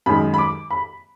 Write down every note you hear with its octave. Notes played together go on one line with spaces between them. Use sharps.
F#2 D#3 G#3 B5
B5
D6
B5